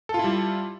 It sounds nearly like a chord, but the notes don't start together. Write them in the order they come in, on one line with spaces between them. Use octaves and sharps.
A4 F4 E4 G3